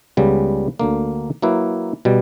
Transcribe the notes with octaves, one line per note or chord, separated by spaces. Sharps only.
C#2 C#3 G3 B3
D2 D3 A#3
F#3 A#3 E4 B4
B2 G3